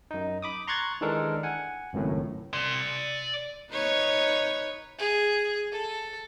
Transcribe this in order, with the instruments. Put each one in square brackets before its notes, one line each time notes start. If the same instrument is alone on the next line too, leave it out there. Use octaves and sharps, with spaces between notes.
[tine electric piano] F#2 D#4
B5 D6 D#6
A#5 C6 C#6 F#6 G#6 A6
D#3 E3 G#3 D4 A4 A#4
F#5 G#5
G#1 C#2 F#2 A2
[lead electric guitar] D5 C6
[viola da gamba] D#4 B4 C#5
[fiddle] G#4
A4